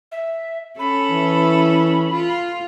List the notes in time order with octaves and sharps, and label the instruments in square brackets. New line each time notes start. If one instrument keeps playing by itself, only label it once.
[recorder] E5
[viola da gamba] C#4 A4 [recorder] B5
[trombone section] E3
[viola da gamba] F4